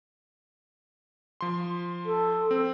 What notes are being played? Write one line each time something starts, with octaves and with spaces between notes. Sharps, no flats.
F3 C6
A4
C4